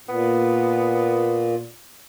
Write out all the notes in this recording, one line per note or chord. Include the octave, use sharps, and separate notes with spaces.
A#2 B3